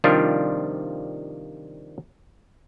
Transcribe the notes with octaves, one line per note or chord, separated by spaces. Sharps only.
C3 D#3 F3 G3 D4 F4